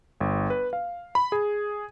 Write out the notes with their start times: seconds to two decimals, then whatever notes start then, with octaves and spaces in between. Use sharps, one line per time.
0.21 G1
0.50 B4
0.73 F5
1.15 B5
1.32 G#4